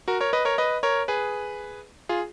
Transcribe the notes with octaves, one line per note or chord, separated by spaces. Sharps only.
F#4 A#4
A#4 C#5
B4 D#5
A#4 C#5
B4 D#5
A#4 C#5
G#4 B4
F4 G#4